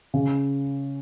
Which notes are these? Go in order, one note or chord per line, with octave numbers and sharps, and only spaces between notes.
C#3